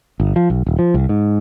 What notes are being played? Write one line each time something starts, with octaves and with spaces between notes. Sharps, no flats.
G1
F3
B1
D#1
F3
C2
G#2